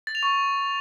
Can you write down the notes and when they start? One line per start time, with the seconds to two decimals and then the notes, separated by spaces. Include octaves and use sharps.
0.07 A6
0.15 F7
0.23 C#6